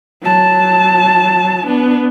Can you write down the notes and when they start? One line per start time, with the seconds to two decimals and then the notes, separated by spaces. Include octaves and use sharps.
0.23 F#3 A5
1.67 B3 D4